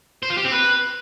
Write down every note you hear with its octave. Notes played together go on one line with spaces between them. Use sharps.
C5
F4
G4
C4
B4